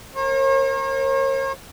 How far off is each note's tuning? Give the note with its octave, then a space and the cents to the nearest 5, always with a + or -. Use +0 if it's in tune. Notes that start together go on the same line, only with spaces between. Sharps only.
A#4 +0 C#5 -45